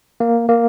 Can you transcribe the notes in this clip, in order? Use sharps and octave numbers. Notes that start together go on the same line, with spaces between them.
A#3
A#3